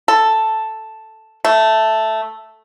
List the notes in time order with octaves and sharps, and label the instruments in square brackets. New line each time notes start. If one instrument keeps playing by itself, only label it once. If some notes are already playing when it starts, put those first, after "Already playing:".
[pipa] A4
A3